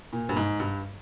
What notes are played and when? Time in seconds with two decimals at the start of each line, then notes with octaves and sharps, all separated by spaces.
0.13 A#2
0.29 G2
0.37 G#2
0.60 G2